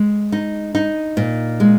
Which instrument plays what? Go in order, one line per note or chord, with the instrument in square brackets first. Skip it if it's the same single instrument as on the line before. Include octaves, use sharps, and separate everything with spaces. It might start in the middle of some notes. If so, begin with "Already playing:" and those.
Already playing: [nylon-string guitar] G#3
D#4
D#4
A#2
G#3